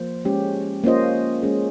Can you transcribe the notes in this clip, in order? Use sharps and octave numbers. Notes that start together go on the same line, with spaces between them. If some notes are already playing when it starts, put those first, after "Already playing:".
Already playing: F3 A#3 C5
G#3 C#4 G4
A#3 C#4 F4 C5 D#5
G#3 C#4 G#4